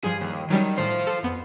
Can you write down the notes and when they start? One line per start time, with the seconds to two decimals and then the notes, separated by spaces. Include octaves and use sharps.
0.04 G2 F3 G#4
0.21 D#2
0.50 D#3 F#3 G3 C#4
0.78 A2 D#3 F4 C5
1.07 A4
1.23 F2 B3